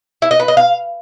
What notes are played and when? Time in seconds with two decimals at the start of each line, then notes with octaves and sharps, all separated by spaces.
0.22 E4
0.31 D#5
0.40 B4
0.48 D#5
0.57 F5